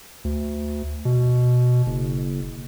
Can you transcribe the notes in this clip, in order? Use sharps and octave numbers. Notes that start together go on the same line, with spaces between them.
D2
B2
F#1